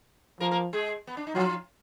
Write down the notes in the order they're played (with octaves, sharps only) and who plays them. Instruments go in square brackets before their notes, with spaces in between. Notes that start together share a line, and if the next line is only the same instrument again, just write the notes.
[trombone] F3 [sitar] A#3 A#4
[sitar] A#3 A#4
G#3 G#4
B3
D4
D#4
[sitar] F3 F4 [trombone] F#3